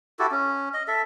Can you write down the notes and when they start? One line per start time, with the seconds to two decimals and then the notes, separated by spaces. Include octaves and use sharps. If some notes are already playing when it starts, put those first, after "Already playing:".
0.19 E4 F#4 G4 A4
0.31 C#4
0.74 D#5
0.88 A4 E5